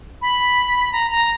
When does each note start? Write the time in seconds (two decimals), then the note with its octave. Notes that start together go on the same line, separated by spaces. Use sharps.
0.22 B5
0.92 A#5
1.11 A#5